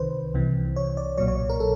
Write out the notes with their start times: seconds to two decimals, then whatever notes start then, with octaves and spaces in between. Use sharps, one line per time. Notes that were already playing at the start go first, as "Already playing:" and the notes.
Already playing: C2 C3 D#3 B4 C5
0.34 C2 C3 E3
0.76 C#5
0.97 D5
1.17 B1 A#2 F#3 C#5
1.28 C#5
1.50 A#4
1.60 A4